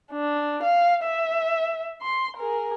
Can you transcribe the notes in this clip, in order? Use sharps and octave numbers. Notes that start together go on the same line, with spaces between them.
D4
F5
E5
C6
G#4 A#4